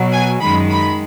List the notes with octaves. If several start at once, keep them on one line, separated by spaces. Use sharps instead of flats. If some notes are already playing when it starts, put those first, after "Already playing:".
Already playing: B2 F#3
G#5
F#2 D#3 G#3 B5
B5